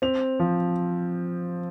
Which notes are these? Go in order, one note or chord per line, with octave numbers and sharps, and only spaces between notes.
C4 F7
F3